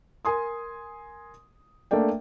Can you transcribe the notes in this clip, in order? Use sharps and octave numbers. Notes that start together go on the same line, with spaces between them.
A#4 G#5 C6 D#6
A3 A#3 D4 D5 G5